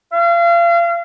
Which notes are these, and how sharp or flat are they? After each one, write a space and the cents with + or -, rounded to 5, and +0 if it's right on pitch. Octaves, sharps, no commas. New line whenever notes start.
F5 -35